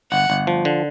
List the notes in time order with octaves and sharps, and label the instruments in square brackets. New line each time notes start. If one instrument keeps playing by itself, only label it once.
[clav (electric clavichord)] G1 [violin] F#5
[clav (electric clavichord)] G1
F3
D3